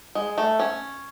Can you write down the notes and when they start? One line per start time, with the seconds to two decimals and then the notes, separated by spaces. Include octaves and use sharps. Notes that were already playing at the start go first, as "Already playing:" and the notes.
0.15 G#3
0.38 A3
0.60 C#4